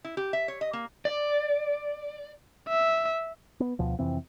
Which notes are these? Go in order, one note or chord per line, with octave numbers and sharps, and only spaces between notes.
E4
G4
E5
C#5
D#5
A#3
D5
E5
B3
D2 B2 F3
F2 C3 E3 C4